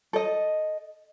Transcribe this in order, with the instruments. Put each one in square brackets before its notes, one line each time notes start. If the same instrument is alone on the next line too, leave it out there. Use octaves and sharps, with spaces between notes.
[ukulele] A4 D#5